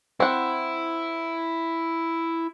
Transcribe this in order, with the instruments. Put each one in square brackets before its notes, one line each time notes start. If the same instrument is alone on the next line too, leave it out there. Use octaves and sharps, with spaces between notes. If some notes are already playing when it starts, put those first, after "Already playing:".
[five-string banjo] C4 F#5 [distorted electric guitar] E4